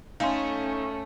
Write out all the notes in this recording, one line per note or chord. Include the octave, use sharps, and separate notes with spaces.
A3 C#4 D#4 F5 G#5 C6